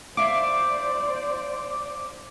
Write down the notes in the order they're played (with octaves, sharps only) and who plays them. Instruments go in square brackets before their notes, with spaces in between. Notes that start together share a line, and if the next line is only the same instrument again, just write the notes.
[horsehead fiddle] C5 D5 [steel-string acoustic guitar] E5 F5 [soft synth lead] D6